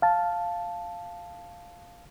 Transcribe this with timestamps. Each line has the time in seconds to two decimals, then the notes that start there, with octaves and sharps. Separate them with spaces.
0.02 F5 A5